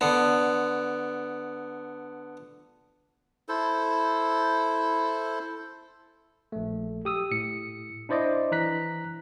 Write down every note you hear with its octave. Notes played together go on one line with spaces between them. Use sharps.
D3 B3
E4 A4 C5
A#1 A3
G4 D#6 E6
A2 C#7
D4 E4 C5 D5 D#5
E3 A#5 F#6 B6